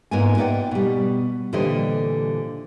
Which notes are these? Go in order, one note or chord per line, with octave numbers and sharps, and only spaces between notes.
G#2 A#3 B3 F4 G#5
B4 C5 D5 D#5 F#5 G5
B2 G3
A#2 D3 E3 G3 C5 D#5